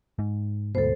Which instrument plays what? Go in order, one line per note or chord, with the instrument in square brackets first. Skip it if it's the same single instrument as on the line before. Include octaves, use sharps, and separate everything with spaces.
[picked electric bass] G#2
[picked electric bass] D2 G#2 B2 [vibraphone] A4 C5